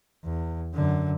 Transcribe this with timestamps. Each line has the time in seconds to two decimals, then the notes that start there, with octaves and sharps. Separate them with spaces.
0.24 E2
0.74 F#2 D3